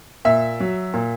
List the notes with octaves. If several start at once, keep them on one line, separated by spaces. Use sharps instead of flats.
A#2 E5
F#3
A#2